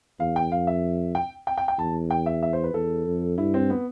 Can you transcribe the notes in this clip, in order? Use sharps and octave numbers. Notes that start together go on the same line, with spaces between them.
E2 F5
G5
F2 F5
E5
G5
G5
G5
G5
E2 A5
G5
E5
E5
C5
B4
E2 A4
F2
G2 E4
C4
B3